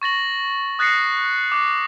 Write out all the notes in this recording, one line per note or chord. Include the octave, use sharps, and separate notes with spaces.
C#6 A6 A#6 F#7
D#6 F#6 A6 A#6 C7 C#7
D6 F#6